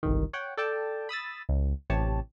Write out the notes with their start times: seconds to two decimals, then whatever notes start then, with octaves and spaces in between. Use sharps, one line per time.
0.03 G1 C2 G#2 D#3
0.33 C#5 F#5 G5
0.57 A4 D5 G5 A5
1.09 B5 D#6 E6 A6
1.49 C#2
1.90 A1 C3 E3 G4 C#5 A5